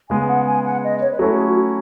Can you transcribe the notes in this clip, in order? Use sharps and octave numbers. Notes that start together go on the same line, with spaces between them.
C#3 G#3 B3 G#5
F#5
G#5
F#5
D#5
C#5
B4
F#3 A3 C#4 E4 A4
G#4
F#4
F#4